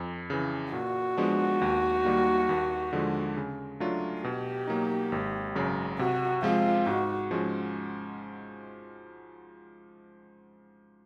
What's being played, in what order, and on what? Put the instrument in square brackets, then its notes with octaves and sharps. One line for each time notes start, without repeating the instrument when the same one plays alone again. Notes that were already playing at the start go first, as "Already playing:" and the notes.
Already playing: [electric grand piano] F2
C#3 E3
[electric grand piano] A#2 [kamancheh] F#4
[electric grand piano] F3 G#3 B3 D4
D#2
D#3 G3 A#3
D#2
D3 F3 G#3
C#3
F#3 A3 D4 F4
[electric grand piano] B2 [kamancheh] G4
[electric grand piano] F#3 A#3 D#4
G#1
F#2 C#3 F#3
[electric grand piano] C3 [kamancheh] F#4
[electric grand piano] F3 G#3 C4 [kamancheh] F4
[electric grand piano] G#2 [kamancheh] F#4
[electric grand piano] F3 G#3 C#4 F#4